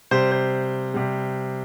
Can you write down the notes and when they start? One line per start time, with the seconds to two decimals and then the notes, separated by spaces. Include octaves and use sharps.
0.11 C3 G3 C5
0.32 C5
0.94 C3 G3